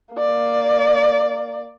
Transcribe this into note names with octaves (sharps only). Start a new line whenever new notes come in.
A#3 D5